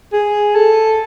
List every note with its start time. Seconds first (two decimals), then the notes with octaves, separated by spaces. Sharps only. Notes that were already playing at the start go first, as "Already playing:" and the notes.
0.13 G#4
0.55 A4